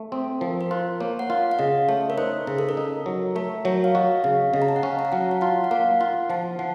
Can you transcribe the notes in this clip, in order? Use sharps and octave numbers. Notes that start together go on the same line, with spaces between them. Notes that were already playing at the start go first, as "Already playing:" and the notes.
Already playing: A3
C4 A4
F3 A#4
A#4
F4 C5
A#3 C#5
F#5
F4 F5
F5
C#3 D#5
A3 C#5
A#4
D#4 C5
C#3 A#4
A4
A#4
D#4
F#3
A3 A#4
F#3 C#5
F5
F#4 D#5
C#3 F5
C#3 D#5
A#5
A5
F#5
C#4 F5
A#5
A5
F#3 F#5
F5
F4 F#5
F#5
A#3 F5
F4 F#5
F3 A5
F3 F#5